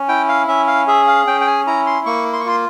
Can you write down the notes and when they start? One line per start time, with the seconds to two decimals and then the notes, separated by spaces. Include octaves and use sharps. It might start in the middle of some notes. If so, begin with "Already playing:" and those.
Already playing: C#4
0.09 E4 G5
0.28 F5
0.48 C#4 E5
0.68 F5
0.88 G#4 E5
1.07 F5
1.27 C#4 G5
1.41 G5
1.47 G#5
1.67 E4 A#5
1.86 C6
2.06 A#3 C#6
2.33 C6
2.40 C#6
2.46 F4 C6